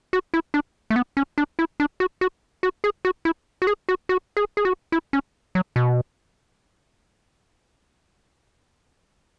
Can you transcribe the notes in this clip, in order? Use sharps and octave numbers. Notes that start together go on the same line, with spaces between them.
F#4
E4
D4
A3
B3
C#4
D4
E4
D4
F#4
F#4
F#4
G#4
F#4
E4
F#4
G#4
F#4
F#4
G#4
G#4
F#4
E4
C#4
F#3
B2